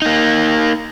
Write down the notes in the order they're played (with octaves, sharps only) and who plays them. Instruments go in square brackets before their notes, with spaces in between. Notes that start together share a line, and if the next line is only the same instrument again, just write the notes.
[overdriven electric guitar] A#3 D#4